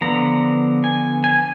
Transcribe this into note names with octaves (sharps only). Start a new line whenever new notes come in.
D3 F3 B3 A#5
G#5
G#5